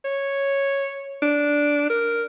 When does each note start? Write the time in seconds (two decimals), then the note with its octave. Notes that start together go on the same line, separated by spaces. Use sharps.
0.05 C#5
1.22 D4
1.90 A#4